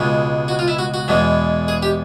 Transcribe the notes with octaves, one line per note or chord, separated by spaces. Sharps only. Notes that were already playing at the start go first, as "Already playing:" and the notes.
Already playing: C#2 B2 G#3
F#4
F4
E4
F#4
F#4
E2 B2 G#3
G#4
G4